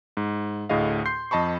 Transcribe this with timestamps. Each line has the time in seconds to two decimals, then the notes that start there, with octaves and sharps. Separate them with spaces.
0.17 G#2
0.69 D2 A2 G#4 D#5 F5
1.05 C6 G6 C7
1.31 F2 D#5 A5 B5 C#6